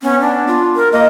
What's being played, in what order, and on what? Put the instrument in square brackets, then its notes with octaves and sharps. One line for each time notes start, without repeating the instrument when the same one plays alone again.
[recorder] B3 [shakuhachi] C#4
[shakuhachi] D4
[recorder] F4
[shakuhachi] A#4
[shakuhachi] A#3 [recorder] D#5